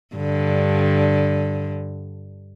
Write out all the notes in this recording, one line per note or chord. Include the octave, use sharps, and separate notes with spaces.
G2 D3